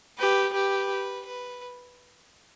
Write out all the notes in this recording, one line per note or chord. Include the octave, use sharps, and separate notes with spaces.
G4 B4
G4 B4
B4